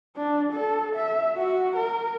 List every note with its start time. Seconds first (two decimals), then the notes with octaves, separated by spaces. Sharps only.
0.16 D4
0.53 A4
0.96 E5
1.37 F#4
1.76 A#4